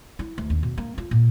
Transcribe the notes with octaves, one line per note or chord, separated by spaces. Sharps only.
E4
D2
D#2
B2
A#3
F4
A#2